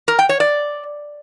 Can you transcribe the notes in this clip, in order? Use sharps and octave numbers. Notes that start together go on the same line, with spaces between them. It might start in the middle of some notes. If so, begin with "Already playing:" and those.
A#4
G5
C#5
D5